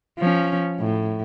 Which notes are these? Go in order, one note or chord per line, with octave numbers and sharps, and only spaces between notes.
F3 C#4
A2